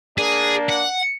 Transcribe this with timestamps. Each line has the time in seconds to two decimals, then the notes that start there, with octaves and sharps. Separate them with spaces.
0.18 A#3 D4 G#4
0.69 F#5